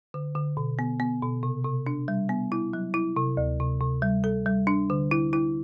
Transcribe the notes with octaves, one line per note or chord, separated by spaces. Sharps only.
D3
D3
B2
B3
B3
B2
C3
C3
D4
G3
B3
E4
F#3
E4
C3
D2
C3
C3
G3
A4
G3
D4
D3
E4
E4